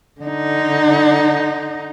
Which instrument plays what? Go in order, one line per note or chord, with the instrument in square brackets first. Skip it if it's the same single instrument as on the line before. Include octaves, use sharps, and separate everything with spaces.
[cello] D3 D#4